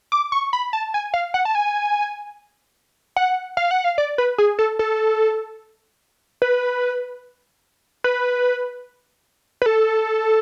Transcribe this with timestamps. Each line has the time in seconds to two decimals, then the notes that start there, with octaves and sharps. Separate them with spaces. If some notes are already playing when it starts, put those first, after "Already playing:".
0.12 D6
0.32 C#6
0.53 B5
0.73 A5
0.94 G#5
1.14 F5
1.34 F#5
1.45 A5
1.55 G#5
3.16 F#5
3.57 F5
3.71 F#5
3.84 F5
3.98 D5
4.18 B4
4.38 G#4
4.59 A4
4.79 A4
6.42 B4
8.04 B4
9.62 B4
9.66 A4